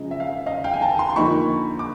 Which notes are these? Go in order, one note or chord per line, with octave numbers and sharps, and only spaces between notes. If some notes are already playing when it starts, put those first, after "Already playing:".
Already playing: F#2 C#3 F3 G#3 D#5
E5
F5
E5
D#5 F5
F5 G5
G#5
G5 A5
A#5 C6
C6
D3 F3 A#3 D#4 B5 C#6
D6